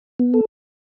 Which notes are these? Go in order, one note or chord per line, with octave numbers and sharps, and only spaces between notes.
B3
A4